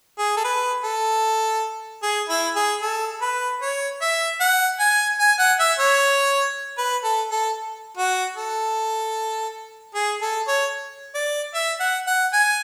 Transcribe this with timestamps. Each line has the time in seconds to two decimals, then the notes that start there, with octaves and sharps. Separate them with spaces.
0.19 G#4
0.37 A4
0.45 B4
0.84 A4
2.03 G#4
2.29 E4
2.56 G#4
2.82 A4
3.22 B4
3.62 C#5
4.02 E5
4.41 F#5
4.80 G#5
5.20 G#5
5.39 F#5
5.60 E5
5.79 C#5
6.78 B4
7.04 A4
7.31 A4
7.97 F#4
8.37 A4
9.95 G#4
10.22 A4
10.48 C#5
11.15 D5
11.54 E5
11.80 F#5
12.07 F#5
12.33 G#5